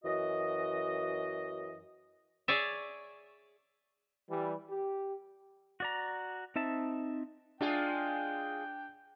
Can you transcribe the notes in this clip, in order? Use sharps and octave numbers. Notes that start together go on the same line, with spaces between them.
F#2 E3 F#4 D#5
G#4 C#5 D5 E5
E3 G3
G4
F#4 D5 A#5
C4 D#4 E5 A5
G#3 D4 F4 G#4 G5